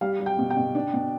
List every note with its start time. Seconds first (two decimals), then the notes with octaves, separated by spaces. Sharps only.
0.01 G3 F5
0.20 G3
0.26 G5
0.38 B2
0.50 G5
0.56 B2
0.75 D4
0.93 B2